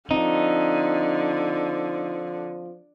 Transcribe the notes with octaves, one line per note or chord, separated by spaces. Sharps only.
D3 F3 C4 D#4